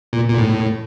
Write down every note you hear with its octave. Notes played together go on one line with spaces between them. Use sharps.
A#2
A#2
A2